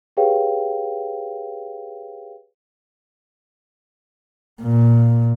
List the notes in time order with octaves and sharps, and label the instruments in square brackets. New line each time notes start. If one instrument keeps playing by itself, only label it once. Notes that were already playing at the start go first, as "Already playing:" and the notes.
[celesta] G4 G#4 B4 C#5 F5 G5
[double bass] A#2